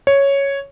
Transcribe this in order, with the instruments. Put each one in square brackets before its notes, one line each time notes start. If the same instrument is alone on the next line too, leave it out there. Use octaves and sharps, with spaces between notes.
[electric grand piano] C#5